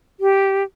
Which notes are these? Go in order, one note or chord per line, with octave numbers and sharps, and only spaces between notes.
G4